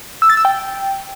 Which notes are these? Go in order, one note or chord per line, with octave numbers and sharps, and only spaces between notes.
E6
A6
E6
G5